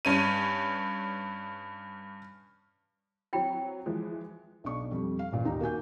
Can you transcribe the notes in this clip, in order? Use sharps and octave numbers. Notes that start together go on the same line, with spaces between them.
G2 C#4 D#7
F#3 C4 E4 G5 B5
E3 F3 G#3
B1 D4 C#6
F2 G3
F5
A1 A#2
D#2 D#4 G4 A#5
A#3 F#4 G#5 G6